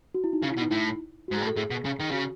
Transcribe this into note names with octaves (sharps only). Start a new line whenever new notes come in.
F#4
E4
D#4
C#3
E4
B2
D#4
A2 E4
F#4
G#2
G#4
A2
A4
A2 G#4
B2
C#3
D#3
C#3 F#4